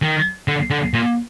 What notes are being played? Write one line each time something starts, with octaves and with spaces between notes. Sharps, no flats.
D#3
D3
D3
A#2